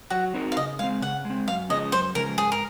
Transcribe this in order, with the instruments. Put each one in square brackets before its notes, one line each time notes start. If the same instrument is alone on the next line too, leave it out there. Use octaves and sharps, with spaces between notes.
[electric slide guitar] F#3 [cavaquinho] F#4
[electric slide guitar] C4 D#4 F#4 A#4
[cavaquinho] F5
[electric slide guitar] C#3 [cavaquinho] D#5
[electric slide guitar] G#3 C4 [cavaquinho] F5
[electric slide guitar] C#3 [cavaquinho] F#5
[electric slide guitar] G#3 C4
[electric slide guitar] F#2 [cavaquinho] F5
[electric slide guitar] C#3 F3 G#3 C#4 [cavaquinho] D#5
[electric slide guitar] F#2 [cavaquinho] C5
[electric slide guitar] C#3 F3 G#3 C#4 [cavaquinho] A#4
[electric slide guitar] G#2 [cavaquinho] G#4
[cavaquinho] A#4